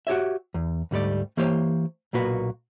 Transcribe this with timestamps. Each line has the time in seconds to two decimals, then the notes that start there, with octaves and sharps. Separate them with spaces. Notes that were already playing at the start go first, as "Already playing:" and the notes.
0.07 F#4 G4 C#5 E5
0.54 E2
0.91 D2 G#2 G3 A3 D5
1.37 E3 A#3 G4 C5 C#5
2.13 B1 A#2 A#3 F#4 B4